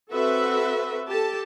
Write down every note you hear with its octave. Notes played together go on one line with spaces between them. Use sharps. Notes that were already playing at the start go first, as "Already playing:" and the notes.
C4 F#4 A4 B4 E5
G4 A4 A5